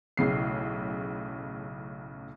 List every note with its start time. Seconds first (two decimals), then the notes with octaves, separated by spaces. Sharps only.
0.17 B1 A2 C#3 C7